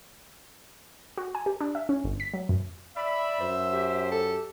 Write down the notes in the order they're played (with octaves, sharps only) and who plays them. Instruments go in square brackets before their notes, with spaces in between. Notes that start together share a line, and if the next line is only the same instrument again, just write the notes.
[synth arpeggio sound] F#4
G#5
G4
D4
E5
C#4
G1
B6
F#3
F#2
[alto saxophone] D5 [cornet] E5 [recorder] B5
[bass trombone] F#2 [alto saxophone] C5
[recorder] G4
[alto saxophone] A4